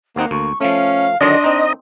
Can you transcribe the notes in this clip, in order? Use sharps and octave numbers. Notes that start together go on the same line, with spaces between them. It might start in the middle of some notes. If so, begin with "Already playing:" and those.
D#2 A#3 C4 D#4 F#5
D2 C#6
F3 A3 C#4 F5
D3 D#3 F#3 D4 D#5 C6
C4 D#4